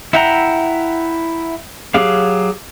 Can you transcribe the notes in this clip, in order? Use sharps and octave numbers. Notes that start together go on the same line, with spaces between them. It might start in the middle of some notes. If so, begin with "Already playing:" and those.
E4 E5 F#5 G5 A#5
F#3 G4 G#4 F5